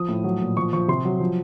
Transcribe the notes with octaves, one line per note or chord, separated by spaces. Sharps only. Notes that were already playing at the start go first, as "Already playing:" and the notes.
Already playing: F3 D#6
A2
F#3
A#2
F3 C#6
F3 C#6
C3 C6
F#3
F3